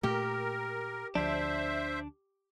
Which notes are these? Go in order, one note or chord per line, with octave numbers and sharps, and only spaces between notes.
A#2 A3 G4 A#4
D2 F3 D4 C5 E5